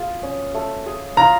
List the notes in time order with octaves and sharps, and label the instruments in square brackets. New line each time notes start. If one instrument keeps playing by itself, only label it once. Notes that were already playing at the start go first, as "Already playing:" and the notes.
Already playing: [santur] F4 G#4
C#4
A3
G#4
[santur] F4 [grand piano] A#5